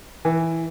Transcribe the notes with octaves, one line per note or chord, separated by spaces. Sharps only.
E3